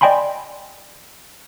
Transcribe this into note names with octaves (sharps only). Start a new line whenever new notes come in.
D5 D#5 G5 G#5 B5 C6